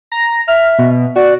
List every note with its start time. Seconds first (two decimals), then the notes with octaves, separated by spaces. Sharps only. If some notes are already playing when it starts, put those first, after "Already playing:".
0.12 A#5
0.48 E5 F6
0.79 B2
1.16 F#4 D5